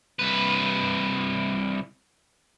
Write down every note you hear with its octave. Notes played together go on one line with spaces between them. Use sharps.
C2 B4